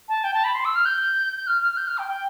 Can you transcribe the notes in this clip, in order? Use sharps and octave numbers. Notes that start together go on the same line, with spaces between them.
A5
G5
A5
B5
C6
E6
F6
G6
G6
F6
F6
F6
G6
F6
G5
G5